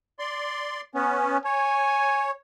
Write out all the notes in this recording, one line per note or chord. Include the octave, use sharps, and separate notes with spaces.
D5 C6
B3 C#4
C#5 G#5